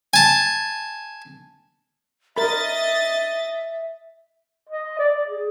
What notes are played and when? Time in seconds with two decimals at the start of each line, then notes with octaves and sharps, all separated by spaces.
0.13 G#5 A5
2.36 A#4 D#5 E5 B5 A6
4.69 D#5
4.99 D5
5.27 G#4